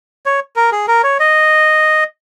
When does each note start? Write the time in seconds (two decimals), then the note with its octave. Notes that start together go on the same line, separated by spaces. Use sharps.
0.26 C#5
0.56 A#4
0.72 G#4
0.88 A#4
1.03 C#5
1.19 D#5